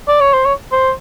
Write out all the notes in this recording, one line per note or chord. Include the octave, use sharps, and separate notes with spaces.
D5
C#5
C5
C#5
C5